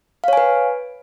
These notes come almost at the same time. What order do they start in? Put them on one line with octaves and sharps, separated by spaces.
F5 C#5 G#5 B4